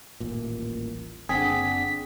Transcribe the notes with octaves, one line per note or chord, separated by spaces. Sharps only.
D#1 A1 A#2
F#1 D3 C4 D4 G#4 F#5 B6